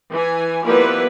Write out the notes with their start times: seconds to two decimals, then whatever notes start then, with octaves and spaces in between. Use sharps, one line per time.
0.12 E3 G#5
0.64 F3 G3 A#3 B3 E4 B4